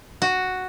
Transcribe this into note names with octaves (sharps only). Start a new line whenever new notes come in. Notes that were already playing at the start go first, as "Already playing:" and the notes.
F#4